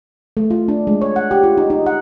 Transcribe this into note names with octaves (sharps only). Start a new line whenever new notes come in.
A3
F4
D4
G#3
C#5
F#5
G4
F4
D#4
D#4
F#5